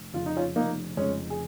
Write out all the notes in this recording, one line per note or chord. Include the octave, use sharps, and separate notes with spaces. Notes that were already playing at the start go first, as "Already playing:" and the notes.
Already playing: F1
F2 C#3 F3 F4
D#4
C#4 F4
F1 A#3 D#4
F2 C#3 F3 G#3 C#4
G#4